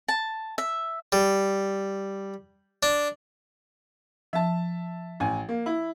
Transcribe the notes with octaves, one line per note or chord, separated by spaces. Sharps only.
A5
E5
G3
D4
F3 E5 A5
A1 G#5
A#3
E4